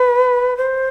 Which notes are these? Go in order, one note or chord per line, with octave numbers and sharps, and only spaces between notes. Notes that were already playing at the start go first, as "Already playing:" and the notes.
Already playing: B4
C5